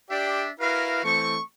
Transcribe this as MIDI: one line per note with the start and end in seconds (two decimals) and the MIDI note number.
0.10 0.51 62
0.10 0.44 67
0.10 0.44 74
0.10 0.51 76
0.10 0.44 79
0.60 1.03 64
0.60 1.03 66
0.60 1.03 70
0.60 1.03 71
0.60 1.03 77
1.04 1.37 52
1.04 1.37 57
1.04 1.37 60
1.04 1.41 85